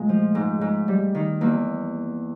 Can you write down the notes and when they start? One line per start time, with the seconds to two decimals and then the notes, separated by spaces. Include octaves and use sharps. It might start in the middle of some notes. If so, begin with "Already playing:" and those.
Already playing: A#2 G#3 A3
0.09 F3
0.35 G#2
0.61 G#2
0.88 G3
1.15 D#3
1.41 E2 A#3